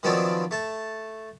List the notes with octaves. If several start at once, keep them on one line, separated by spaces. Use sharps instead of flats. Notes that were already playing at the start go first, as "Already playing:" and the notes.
D#3 F3 F#3 B3 C4 D4
A3 A5